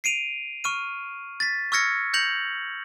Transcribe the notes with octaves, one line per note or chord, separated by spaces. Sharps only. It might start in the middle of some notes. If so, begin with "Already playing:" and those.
C7 D7 D#7 F7
C#6 F6 D#7
A6 B6
C#6 E6 F6 G#6 A#6 C#7
G6 A#6 C#7 F7 F#7